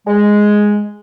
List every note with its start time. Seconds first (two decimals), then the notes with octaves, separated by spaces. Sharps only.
0.06 G#3